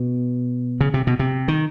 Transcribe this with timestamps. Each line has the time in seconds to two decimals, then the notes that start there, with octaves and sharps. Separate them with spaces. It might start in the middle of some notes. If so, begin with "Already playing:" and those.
Already playing: B2
0.81 C#3
0.94 C3
1.07 B2
1.19 C3
1.48 D#3